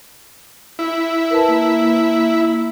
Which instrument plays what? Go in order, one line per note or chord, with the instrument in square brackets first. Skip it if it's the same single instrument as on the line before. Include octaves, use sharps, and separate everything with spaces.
[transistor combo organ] E4
[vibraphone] A#4 B4 A5
A#3